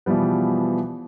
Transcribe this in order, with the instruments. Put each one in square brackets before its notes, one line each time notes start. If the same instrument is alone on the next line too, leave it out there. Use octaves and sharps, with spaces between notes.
[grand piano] B2 E3 F3 G3 B3